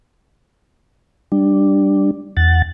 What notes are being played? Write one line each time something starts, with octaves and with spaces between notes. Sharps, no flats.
G3 D4
E2 F#5 A6